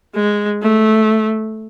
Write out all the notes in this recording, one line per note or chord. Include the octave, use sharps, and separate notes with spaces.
G#3
A3